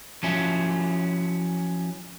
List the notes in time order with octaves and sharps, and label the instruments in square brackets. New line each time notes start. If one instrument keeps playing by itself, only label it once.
[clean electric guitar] F3 F#3 C#4 E4